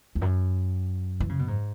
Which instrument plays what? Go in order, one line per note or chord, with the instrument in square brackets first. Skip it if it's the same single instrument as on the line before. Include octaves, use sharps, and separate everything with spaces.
[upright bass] E2
F#2
E3
C#3
B2
G#2